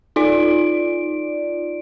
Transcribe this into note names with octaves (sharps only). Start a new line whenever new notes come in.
D#4 F4 D5 D7